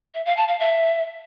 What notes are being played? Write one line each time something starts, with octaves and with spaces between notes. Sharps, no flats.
E5
F5
A5
F5
E5